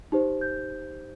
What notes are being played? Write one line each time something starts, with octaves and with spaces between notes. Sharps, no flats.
D#4 G4 C5
G6